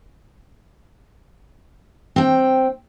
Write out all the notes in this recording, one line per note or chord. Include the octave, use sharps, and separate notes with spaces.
C4 G5